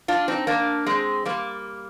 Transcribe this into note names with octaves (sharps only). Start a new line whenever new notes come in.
D4 F4
C4 D#4
A#3 D4
G#3 C4
G3 A#3